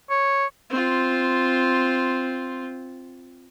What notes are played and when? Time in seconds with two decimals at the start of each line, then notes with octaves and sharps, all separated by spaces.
0.10 C#5
0.70 C4 F4